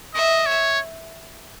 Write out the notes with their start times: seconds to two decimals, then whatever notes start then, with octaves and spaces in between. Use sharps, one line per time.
0.14 D#5 E5
0.46 C#5